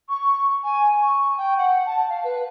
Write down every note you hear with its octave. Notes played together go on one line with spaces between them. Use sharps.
C#6
G#5
C#6
G5
F#5
A5
F5
B4